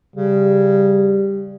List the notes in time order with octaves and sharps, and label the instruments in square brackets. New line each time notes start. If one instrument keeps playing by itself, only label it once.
[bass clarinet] C#3 [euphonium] G3